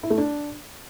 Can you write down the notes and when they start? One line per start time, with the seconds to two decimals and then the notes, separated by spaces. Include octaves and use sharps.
0.03 E4
0.10 A3
0.18 D4